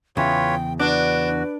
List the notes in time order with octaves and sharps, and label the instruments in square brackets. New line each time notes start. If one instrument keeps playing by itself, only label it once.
[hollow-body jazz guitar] E2 C#3 [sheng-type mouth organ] F4 B4 C#5 [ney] G5
[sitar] D4 [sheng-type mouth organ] F#4 [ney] B4